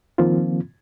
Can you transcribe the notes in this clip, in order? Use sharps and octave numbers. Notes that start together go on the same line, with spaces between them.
D#3 F3 A#3 C4 F4